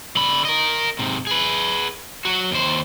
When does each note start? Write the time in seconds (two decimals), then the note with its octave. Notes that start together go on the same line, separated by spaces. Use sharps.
0.17 D3 B5
0.45 A#4 D#5
0.99 G#2 C3
1.27 G#4 B4
2.25 F#3 F#4
2.51 D#2 C5